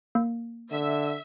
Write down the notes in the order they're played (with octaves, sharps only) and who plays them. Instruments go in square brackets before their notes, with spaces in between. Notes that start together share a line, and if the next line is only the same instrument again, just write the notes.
[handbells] A#3
[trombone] D3 [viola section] E5